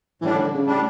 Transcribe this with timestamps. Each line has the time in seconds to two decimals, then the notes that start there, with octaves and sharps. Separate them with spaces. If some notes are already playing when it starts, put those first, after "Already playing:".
0.21 A2 E3 G3 D4
0.33 D3
0.44 D3
0.54 C#3
0.65 A2 G3 D4